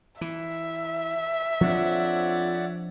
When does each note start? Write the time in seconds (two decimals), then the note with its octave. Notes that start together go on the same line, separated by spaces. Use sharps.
0.21 E3 E5
1.61 F2 F3 D4 C#5 D5 F#5